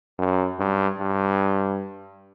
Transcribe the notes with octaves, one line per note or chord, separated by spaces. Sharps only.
F#2
G2
G2